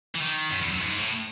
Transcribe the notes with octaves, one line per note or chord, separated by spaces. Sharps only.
E3
D#3
F#2
E2
F#2
G#2
A2